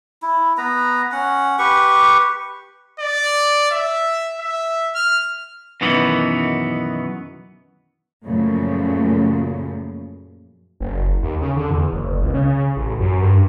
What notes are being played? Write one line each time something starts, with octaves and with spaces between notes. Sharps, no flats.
E4
B3 B4 A#5
C#4 F#5
G4 B4 C#6
D5
E5
E5
F6
F#2 B2 D#3 E3 B3
F#2 A#2 C#3 F3 A3
F#1
D#2
C#3
D3
E2
F#1
C#2
C#3
A1
F#2
G2